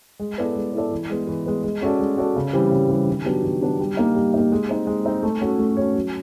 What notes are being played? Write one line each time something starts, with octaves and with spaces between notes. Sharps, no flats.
G#3
B3 E4 A4 D5
G#3
B3 E4 A4 D5
E3
G#3 B3
E3
G#3 B3
G#3
C#4 F#4 A4 D5
G#3
C#4 F#4 A4 D5
C#3
E3 G3 C4
C#3
E3 G3 C4
D#3
F#3 B3 D4 G4
D#3
F#3 B3 D4 G4
G3
A#3 D#4
G3
A#3 D#4
G#3
C4 D#4
G#3
C4 D#4
A3
C#4 F#4 A4 C#5
A3
C#4 F#4 A4 C#5
F#3